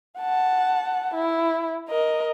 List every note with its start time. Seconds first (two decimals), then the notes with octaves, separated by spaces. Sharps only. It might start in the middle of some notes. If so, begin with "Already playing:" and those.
0.19 F#5 A5
1.15 E4
1.89 A#4 D#5